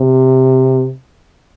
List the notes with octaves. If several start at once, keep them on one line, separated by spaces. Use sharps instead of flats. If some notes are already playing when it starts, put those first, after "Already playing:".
Already playing: C3